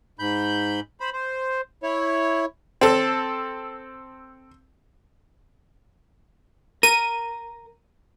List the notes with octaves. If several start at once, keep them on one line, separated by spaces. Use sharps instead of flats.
G#2 B5 G6
C5 B5
C5
E4 C#5
C4 A4
A#4 D#7